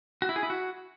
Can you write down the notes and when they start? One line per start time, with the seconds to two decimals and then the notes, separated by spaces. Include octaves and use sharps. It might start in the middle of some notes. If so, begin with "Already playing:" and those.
0.22 F#4
0.29 E4
0.36 G#4
0.43 E4
0.50 F#4